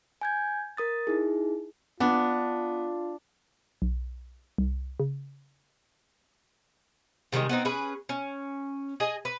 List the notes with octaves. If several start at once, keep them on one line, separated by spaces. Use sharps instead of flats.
G#5 G6 G#6
A#4 D#6 A6
D#4 E4 G#4
B3 D4 F4
B1
C2
C#3
C3 D#3 G3 G#3
B3 C4 D#4
C#4 G#4 B4
C#4
G#4 D#5 G#5
B4